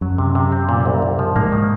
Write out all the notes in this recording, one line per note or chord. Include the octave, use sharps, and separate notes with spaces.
F#2 F#3
C3
C3
C4
A#2
C2
C2
F3
G#2 A#3
D#3